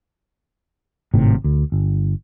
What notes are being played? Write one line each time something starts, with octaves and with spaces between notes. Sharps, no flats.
G#1 A2 C3
D2
G1